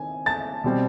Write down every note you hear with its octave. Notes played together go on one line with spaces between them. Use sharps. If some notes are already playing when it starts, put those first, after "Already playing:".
Already playing: D#3 C4 G#5
A5 A6
B2 G3 C4